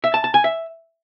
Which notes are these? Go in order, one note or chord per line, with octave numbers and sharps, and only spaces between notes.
E5
A5
A5
G#5
E5